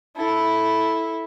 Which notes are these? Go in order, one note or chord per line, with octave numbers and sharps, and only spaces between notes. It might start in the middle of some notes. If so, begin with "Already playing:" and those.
E4 A4